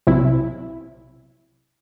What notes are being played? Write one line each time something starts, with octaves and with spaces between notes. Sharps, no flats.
B1 C3 E4